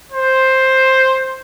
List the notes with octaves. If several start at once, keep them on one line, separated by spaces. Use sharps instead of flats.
C5